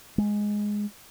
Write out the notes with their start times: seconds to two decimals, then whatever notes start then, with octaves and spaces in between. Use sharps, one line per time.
0.18 G#3